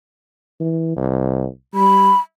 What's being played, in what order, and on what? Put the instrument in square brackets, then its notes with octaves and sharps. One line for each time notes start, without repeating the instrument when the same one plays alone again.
[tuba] E3
C2
[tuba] G3 [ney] B5